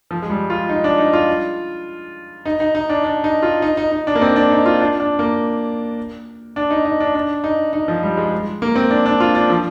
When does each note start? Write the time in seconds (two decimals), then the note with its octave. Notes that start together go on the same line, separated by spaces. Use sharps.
0.11 F3
0.22 G#3
0.30 G3
0.50 F4
0.69 D#4
0.84 D4
0.98 D#4
1.13 F4
2.46 D#4
2.60 D#4
2.75 D#4
2.89 D4
3.04 D4
3.24 D#4
3.42 F4
3.62 D#4
3.77 D#4
3.92 D#4
4.07 D4
4.15 A#3
4.21 C4
4.36 D4
4.51 D#4
4.66 F4
4.80 D4
5.00 D4
5.19 A#3
6.56 D4
6.71 D#4
6.85 D#4
7.00 D4
7.15 D4
7.44 D#4
7.73 D#4
7.88 F3
8.03 G3
8.17 G#3
8.32 G#3
8.62 A#3
8.76 C4
8.90 D4
9.06 D4
9.20 F4
9.35 D4
9.50 F3